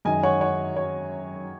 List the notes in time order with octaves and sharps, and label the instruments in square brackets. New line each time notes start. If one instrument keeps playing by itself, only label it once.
[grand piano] F#2 D#3 G#3 [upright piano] D#5 G#5
[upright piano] C#5 F#5
C#5 F#5
C#5